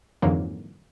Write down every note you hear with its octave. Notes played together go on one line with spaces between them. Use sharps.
F2 G#2 D3 E3 F#3 A#3